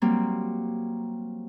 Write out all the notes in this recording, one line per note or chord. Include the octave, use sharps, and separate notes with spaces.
F#3 G3 A#3 C4